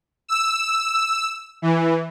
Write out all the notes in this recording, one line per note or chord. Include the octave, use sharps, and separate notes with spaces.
E6
E3